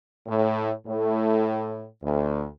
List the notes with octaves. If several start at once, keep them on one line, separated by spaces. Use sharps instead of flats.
A2
A2
D2